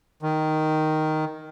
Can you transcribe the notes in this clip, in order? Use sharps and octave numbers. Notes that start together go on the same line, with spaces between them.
D#3